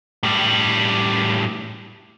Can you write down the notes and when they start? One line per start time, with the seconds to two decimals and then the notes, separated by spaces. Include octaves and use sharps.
0.23 A2 G3